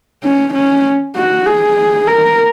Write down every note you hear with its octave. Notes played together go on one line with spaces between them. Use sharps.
C#4
C#4
F#4
G#4
A#4